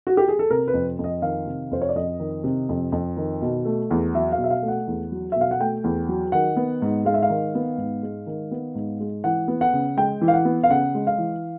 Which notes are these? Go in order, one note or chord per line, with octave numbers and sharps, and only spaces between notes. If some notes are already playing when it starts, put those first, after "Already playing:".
F#4
G4
G#4
A4
C3 A#4
B4
F2
F2
D#5
D#3 F5
C3
F2 C5
C#5
D5
F2 D#5
D#3
C3
F2
F2
D#3
B2
A3
E2
F#3 E5
F5
B2
E5
F5
A3
F#5
E2
F#3
B2 E5
F5
F#5
A3 G5
E2
F#3
D#3 F#5
B3
G#2
G#3 F5
E5
F5
D#3
B3
G#2
G#3
D#3
B3
G#2
G#3
E3 F#5
B3
F#5
C#3
G#3 G5
E3
F5
F#5
B3
F5
C#3 F#5
G#3
F5
E3